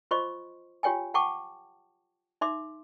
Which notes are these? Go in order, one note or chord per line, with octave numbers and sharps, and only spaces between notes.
F4 C5 D#5 C6 C#6
F4 G4 C#5 G5 G#5
F#5 G5 A5 C#6 D6
D#4 E5 C6 D6